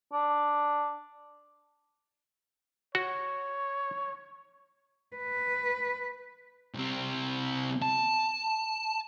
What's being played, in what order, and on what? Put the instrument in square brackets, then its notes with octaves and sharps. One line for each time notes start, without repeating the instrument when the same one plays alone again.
[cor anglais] D4
[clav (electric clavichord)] F#4 [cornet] C#5
[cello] B4
[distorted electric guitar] C2 C4
A5